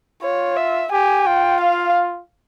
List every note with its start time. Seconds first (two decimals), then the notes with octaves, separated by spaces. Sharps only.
0.22 F4 C#5
0.57 E5
0.92 G4 G#5
1.26 F4 G5
1.61 F5